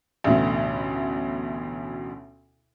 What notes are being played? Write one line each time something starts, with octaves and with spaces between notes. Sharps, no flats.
A1 D2 B2